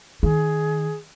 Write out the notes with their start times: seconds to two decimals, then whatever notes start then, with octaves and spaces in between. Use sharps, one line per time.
0.23 D#3 G#4